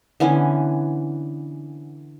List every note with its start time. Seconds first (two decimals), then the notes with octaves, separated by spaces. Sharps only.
0.20 D3 E3 B3 C#4